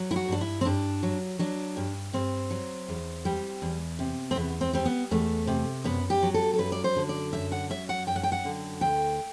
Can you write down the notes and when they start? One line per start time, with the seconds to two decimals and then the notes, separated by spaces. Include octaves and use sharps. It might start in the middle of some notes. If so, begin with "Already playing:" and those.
Already playing: F#3
0.11 E4
0.16 F#4
0.28 G2 D4
0.41 E4
0.61 C4
0.65 G2 D4
1.03 F#3
1.39 F#3 D4
1.77 G2
2.13 G2 C4
2.51 F#3
2.88 E2
3.25 G3
3.62 E2
3.99 C3
4.31 C4
4.36 E2 B3
4.61 C4
4.73 G3 C4
4.85 B3
5.11 E2 A3
5.47 C3
5.84 F#2 B3
6.10 G4
6.23 F#3
6.34 A4
6.53 A4
6.58 F#2 B4
6.72 D5
6.84 C5
6.97 D3
7.09 D5
7.33 F#2 E5
7.52 F#5
7.70 F#3 E5
7.89 F#5
8.07 F#2 G5
8.16 F#5
8.23 G5
8.32 F#5
8.45 D3
8.81 D2 G5